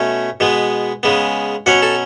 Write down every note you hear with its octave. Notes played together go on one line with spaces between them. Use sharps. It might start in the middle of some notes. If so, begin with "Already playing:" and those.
Already playing: B2 A3 C#4
B2 G#3 B3
C#3 G#3 B3
B2 F#3 C#4 F#5
A4